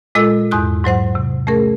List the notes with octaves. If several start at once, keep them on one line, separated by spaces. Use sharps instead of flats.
A#2 G#3 F4 A4 D#5 E6
E2 G#2 D#6 F#6
G#2 F#3 C5 F#5
C3
A3 C#4 G#4 A#4